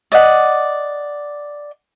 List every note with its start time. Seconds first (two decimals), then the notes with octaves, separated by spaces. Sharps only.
0.12 D5 D#5 F#5